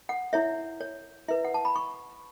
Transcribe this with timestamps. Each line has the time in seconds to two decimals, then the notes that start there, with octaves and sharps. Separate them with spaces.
0.09 F#5
0.33 E4 C#5 E5
0.80 C#5
1.28 E4 B4 E5
1.45 F#5
1.54 A5
1.65 B5
1.76 C#6